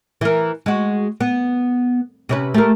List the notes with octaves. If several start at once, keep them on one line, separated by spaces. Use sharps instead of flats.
E3 A#4
G#3 F#4
B3
C3 C#4 B4
A3 G4 A#4